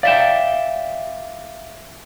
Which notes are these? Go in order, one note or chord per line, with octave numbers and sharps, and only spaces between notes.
D5 E5 F5 G5 E7